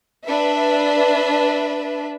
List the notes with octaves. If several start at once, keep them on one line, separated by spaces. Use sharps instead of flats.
D4 B4 E5